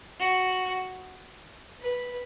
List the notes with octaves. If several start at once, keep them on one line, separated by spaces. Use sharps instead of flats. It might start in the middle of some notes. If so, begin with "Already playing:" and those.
F#4
B4